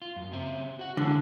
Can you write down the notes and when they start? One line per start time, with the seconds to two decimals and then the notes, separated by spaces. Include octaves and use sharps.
0.02 F4
0.16 F#2
0.32 C#3 C4 E5
0.79 F#4 F#5
0.97 D3 G#3 C#4 E4